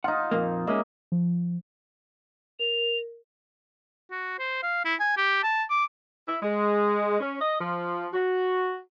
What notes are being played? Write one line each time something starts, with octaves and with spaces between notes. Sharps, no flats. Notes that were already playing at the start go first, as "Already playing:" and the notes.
D#4 F4 F#5
F2 A#2 A#3
G#3 A#3 C#4 D#5 E5
F3
A#4 F7
F#4
C5
F5
E4
G#5
G4
A5
D6
E4
G#3
C#4
D#5
F3
F#4